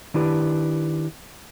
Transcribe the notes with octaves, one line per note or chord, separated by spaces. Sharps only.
D#3 D4 E4 G4 B4